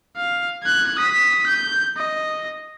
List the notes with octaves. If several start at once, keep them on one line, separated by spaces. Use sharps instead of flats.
F5
F#6 G#6
D#6 B6
G6
D#5